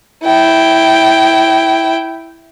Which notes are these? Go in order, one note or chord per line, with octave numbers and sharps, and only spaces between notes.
E4 G5